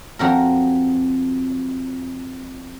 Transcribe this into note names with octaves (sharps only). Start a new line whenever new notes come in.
F2 F#4 A#4